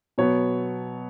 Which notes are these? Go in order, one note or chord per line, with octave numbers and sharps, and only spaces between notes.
B2 F#3 B3 C#5